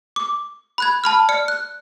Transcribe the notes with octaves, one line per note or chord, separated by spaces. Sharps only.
D6
B5 F#6 G#6
A5 B5 F6
D5 F6 C#7
F#6